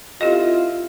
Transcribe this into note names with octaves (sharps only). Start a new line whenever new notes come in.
C4 E4 F4 G4 A4 D#5